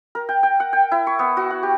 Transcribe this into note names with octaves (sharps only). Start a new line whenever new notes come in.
A#4
G5
G5
F#5
G5
E4
C#6
B3
F#4
F#5
G4